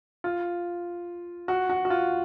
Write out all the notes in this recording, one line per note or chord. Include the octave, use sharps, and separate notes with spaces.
F4
F#4
F#4
F#4
F4